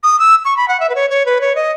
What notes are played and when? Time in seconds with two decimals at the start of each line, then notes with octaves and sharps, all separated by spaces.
0.03 D#6
0.19 E6
0.45 C#6
0.57 B5
0.68 F#5
0.80 E5
0.89 B4
0.95 C#5
1.10 C#5
1.26 B4
1.41 C#5
1.55 D#5